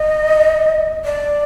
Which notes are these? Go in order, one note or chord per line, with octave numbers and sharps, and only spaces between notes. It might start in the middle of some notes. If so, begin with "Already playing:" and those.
Already playing: D#5
D5